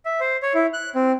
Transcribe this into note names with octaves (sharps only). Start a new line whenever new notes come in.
E5
C5
C#5
E4
F#6
C4